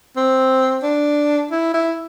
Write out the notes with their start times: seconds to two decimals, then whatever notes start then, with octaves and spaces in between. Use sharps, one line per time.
0.17 C4
0.83 D4
1.51 E4
1.74 E4